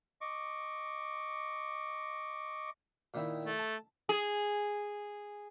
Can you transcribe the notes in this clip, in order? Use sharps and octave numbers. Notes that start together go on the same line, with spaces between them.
D#5 C#6 D6
A#2 D#3 E4
A3
A5
G#4